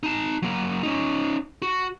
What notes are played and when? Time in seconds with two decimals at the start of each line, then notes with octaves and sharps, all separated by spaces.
0.03 D#4 A5
0.42 F#3 A#3
0.83 C#4 D#4
1.62 F#4